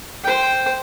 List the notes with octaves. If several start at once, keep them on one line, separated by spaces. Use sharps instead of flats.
C5 G5